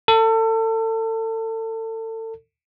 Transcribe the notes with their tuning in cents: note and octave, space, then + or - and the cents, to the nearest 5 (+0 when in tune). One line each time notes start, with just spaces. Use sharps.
A4 +30